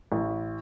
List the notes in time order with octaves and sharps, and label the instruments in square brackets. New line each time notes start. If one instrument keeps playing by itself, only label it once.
[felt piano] A1